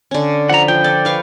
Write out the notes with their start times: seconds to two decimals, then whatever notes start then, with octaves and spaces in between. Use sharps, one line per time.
0.11 D3 C#4
0.49 F3 F#5 A#5 B5
0.68 F3 G5
0.84 A4 D5
1.05 B4 F5 C#6